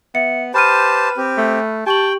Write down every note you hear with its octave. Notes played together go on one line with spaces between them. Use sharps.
B3 E5 C#7
G4 B4 C5 A5 B5 F6 D#7
C4 G4
A3
G4 G5 A5 C#6 F#7